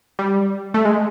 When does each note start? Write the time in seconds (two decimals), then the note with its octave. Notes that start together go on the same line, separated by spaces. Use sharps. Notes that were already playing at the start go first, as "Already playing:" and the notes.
0.19 G3
0.74 A3
0.85 G#3